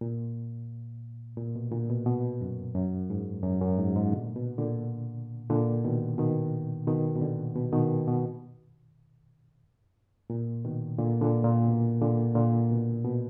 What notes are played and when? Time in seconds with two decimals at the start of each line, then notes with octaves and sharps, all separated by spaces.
0.01 A#2
1.37 A#2
1.56 B2
1.72 A#2 D3
1.90 B2
2.06 B2
2.41 F#2
2.75 F#2
3.10 G#2
3.43 F#2
3.61 F#2
3.78 G#2
3.96 G#2
4.12 A#2 D3
4.36 B2
4.58 A#2 D3
5.50 A#2 D3
5.84 B2 D#3
6.18 B2 D#3
6.87 B2 D#3
7.15 B2
7.21 A#2 D3
7.56 B2
7.73 B2 D#3
8.07 B2
10.30 A#2
10.65 B2 D#3
10.99 A#2 D3
11.22 A#2 D3
11.44 A#2
11.68 B2
12.02 A#2 D3
12.35 A#2 D3
12.71 B2
13.05 B2